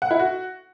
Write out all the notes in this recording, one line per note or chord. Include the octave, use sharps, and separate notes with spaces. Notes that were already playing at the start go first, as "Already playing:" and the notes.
F#5
E4
F#4